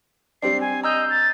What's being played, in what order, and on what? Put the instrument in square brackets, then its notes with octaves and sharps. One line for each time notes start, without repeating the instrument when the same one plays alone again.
[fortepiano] G3 C4 D4 [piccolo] C7
[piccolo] G#5
[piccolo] D#5 [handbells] A#5 E6 G6
[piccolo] A6